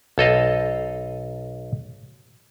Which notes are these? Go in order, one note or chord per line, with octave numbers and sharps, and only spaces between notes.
B1 A4 D#5 F5